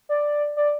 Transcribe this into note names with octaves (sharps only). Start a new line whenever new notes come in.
D5
D5